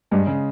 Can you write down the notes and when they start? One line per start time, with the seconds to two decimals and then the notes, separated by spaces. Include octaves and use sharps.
0.11 G2 G#3
0.27 C#3